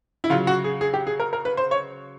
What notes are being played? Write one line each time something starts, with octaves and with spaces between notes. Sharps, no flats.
E4
C#3 F#3 F4
F#4
G#4
G#4
G4
G#4
A#4
A#4
B4
C5
C#5